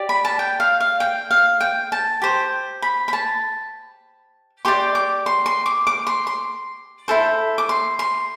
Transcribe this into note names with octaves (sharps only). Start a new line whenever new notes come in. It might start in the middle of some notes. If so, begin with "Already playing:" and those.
Already playing: G4 D5
B5
A5
G5
F5
F5
G5
F5
G5
A5
G4 C5
B5
B5
A5
G4 D5 C6
D6
C6
C6
D6
D6
C6
C6
E4 A4 C5
D6
C6
C6